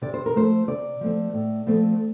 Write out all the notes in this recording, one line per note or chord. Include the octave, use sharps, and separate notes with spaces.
C3 D5
C5
A#4
F3 A3 C4 C5
C3 D5
F3 A3 C4
A2
F3 A3 C4